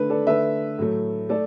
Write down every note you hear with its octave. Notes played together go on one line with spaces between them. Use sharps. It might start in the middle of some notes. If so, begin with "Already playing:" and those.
Already playing: D3 A3 B4
A4 D5
D3 A3 B4 E5
A2 F#3 A3
A3 A4 D5